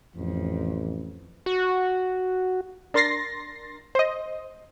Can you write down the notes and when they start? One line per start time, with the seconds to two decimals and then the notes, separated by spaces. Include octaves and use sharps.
0.16 A1 F2
1.46 F#4
2.94 D4 A#4 C6 A6 A#6 C7
3.95 C5 D#5